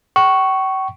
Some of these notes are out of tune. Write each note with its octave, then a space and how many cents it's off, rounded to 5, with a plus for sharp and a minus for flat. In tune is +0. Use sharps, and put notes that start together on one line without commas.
G5 -45 C#6 +0